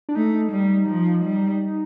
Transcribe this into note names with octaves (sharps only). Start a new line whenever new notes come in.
D4
A3 D#4
G3
F3
G3